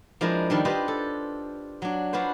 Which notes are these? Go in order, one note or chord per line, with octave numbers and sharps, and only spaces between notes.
F3 G#3 D4 E4 A#4
D#3 G3 D4
D4 F4 G4 B4 C5 D#5
A4
F#3 D4
D4 F4 F#4 B4 C5